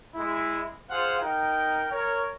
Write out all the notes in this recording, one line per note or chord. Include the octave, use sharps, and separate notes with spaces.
G#3 E4
F4 G#4 C5 F5 F#5
D#4 A#4 G5
A#4 C#5